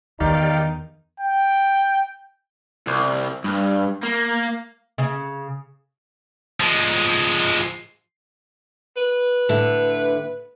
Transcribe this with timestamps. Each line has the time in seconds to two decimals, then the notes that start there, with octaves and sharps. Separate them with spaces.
0.20 E2 D#3 D#4 G4 D5 F5
1.20 G5
2.87 C2
3.44 G2
4.03 A#3
4.98 C#3
6.60 F3 G#3
8.97 B4
9.49 A2 D3 E5